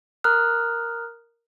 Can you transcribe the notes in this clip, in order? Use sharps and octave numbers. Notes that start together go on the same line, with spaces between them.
A#4 A#5 D#6 F6 F#6